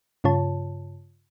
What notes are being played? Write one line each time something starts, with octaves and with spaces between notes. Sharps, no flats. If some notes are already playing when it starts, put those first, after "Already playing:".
G2 C#3 F4 C#5 A5